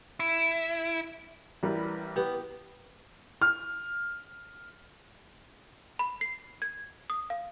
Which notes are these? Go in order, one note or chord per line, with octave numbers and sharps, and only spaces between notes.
E4
A1 G3 A#4 B4
B3 G4
F6
B5
C7
G#6
D#6
F5